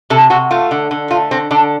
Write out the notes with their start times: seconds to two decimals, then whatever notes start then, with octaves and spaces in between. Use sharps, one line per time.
0.10 C3 A4
0.30 C3 F#4
0.51 A3 F4
0.71 D3
0.91 D3
1.11 A3 F4
1.31 D3 C4
1.51 D3 D4